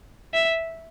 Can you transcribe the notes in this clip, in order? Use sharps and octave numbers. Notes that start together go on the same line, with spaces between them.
E5